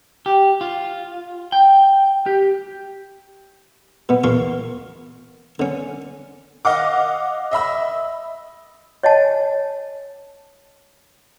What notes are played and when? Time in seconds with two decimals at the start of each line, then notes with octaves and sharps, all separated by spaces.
0.26 G4
0.61 F4
1.52 G5
2.26 G4
4.09 B2 B3
4.24 E2 A#2 F4 F5 C#6
5.60 D3 C#4
6.65 D#5 F5 F#5 D6
7.51 D#5 E5 B5 E6
9.03 C#5 D#5 G#5 A5